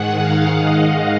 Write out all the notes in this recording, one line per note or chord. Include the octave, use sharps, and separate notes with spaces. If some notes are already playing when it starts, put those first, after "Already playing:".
Already playing: G#2 D#3 G#3 F#5
F5
D#5